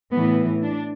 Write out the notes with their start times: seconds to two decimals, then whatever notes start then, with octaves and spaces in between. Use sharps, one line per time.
0.12 A2 E3 B3
0.62 D4